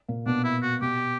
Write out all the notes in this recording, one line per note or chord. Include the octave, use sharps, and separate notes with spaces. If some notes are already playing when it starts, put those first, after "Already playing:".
A#2 A#3
B2 B3 D4
E4
F#4
B2 B3 G4